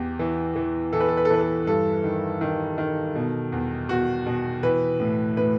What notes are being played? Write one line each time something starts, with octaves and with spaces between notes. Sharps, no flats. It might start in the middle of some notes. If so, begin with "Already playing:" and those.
Already playing: E2 G4
E3
E3
E3 A4
B4
A4
B4
A4
E3 B4
A4
G2 A4
D#3
D#3
D#3
B2
E2
E2 F#4
B2
E3 B4
A2
A2 B4